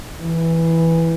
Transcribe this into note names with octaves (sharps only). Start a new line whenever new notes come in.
E3